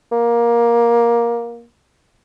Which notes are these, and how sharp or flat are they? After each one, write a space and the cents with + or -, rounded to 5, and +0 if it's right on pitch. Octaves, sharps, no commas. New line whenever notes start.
A#3 +15